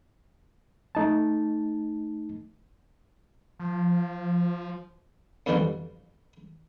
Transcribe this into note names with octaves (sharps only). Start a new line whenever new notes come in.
A3 D#4 A5
F3
F2 B2 D3 E3 F3 G3